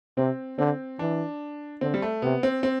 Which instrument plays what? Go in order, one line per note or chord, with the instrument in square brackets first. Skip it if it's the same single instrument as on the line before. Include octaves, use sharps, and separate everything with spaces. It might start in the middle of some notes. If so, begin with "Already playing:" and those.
[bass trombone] C3 [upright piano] C4
[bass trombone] D3 [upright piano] C4
[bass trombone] E3 [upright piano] D4
[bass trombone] D3 [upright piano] C4
[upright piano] G3
A3
[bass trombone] C3 [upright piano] B3
[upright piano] C4
C4